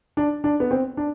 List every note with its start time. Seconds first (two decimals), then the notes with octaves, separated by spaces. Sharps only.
0.17 D4
0.44 D4
0.60 B3
0.71 C4
0.97 D4